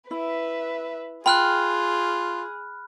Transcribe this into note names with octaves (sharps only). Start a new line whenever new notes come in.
E4 B4 E5
F4 G#4 G5 B5 F6 F#6